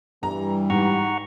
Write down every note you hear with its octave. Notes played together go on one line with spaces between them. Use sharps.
G2 E3 G3 A#5
G#2 F#5 A#5 C#6